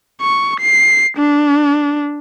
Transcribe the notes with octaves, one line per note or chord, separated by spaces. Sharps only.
C#6
C7
D4